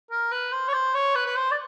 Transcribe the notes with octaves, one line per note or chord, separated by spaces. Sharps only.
A#4
B4
C5
C#5
C5
C#5
B4
B4
C5
D5